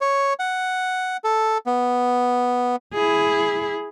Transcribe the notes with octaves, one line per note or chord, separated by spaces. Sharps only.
C#5
F#5
A4
B3
E4 G#4